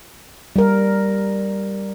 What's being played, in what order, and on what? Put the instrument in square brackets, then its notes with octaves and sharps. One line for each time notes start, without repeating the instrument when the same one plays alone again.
[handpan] G3 A#4